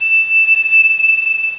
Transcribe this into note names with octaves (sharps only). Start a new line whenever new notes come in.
E7